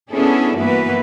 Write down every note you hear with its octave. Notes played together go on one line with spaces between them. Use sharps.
B3 C#4 D4 E4 G#4 A4
G2 E3 A#3 B3 F#4 B4